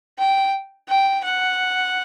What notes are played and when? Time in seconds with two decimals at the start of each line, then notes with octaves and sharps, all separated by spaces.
0.18 G5
0.89 G5
1.24 F#5